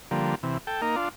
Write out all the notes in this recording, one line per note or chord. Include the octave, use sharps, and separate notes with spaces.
D3 F3 G3 A#3
C3 E3
A4 G5
A#3 D#4 A#4
D4 F4